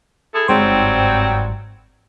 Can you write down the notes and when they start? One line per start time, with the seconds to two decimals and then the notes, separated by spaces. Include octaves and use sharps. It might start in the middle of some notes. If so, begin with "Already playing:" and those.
0.33 E4 G#4 A4
0.48 G1 G#2 F#3 G3 C4 C5